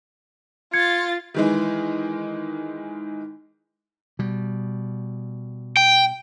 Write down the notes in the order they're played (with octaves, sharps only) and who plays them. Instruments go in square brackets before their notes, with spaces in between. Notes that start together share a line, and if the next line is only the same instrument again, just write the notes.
[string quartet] F4 A6 [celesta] G#6 C#7
[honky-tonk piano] D#3 E3 G#3
[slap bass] B2 G3
[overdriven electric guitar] G5